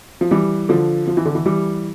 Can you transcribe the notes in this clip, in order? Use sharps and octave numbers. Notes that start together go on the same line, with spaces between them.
F3
E3 G3
D3 F3
F3
E3
D3
E3
E3 G3